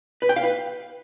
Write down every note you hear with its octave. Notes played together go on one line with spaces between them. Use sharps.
B4
G5
F5
B4